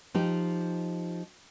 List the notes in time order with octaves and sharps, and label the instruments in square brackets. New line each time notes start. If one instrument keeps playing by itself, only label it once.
[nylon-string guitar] F3 D#4 G4